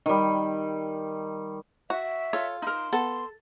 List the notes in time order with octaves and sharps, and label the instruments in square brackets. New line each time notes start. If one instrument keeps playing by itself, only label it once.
[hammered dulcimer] D#3 G3
[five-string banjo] F#4 [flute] E5
[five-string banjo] F4 [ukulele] A4 C#5
[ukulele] D#4 A#4 [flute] C6
[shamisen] B3 [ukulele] A4